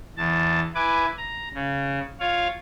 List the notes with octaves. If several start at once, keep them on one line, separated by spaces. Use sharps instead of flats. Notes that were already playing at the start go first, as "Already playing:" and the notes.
E2 A5
E4 B4 G#5 D6
A#5
C#3
F4 C#5 F5